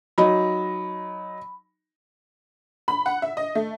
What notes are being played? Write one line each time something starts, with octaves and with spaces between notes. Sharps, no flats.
F#3 D#4 B5
B5
F#5
E5
D#5
A3